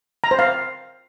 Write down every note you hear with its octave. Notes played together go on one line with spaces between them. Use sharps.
A#5
C5
F5